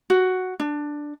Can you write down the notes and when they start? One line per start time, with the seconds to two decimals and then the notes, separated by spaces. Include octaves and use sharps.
0.10 F#4
0.60 D4